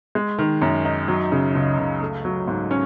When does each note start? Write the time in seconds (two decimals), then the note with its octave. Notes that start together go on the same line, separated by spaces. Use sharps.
0.15 G#3
0.39 D#3
0.62 F#2
0.85 D#4
1.08 F#3
1.32 C#3
1.54 C#2
1.78 C#2
2.01 A3
2.25 F#3
2.47 G#2
2.71 C#4